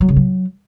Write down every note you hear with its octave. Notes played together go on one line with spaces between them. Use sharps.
F#3
C#3
F#3